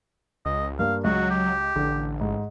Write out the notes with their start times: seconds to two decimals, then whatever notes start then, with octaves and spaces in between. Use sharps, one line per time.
0.46 C#2 D#5
0.79 G2 A#3 F5
1.04 C#2 F#3 F#4 D#5
1.30 G4
1.76 A1 D3
2.21 G#2